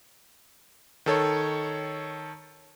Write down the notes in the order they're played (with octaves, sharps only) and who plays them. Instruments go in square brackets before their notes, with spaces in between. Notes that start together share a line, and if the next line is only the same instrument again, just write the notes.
[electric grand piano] D#3 A4 C#5